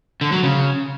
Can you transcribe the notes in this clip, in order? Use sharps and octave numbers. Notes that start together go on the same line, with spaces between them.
D3
F#3
C#3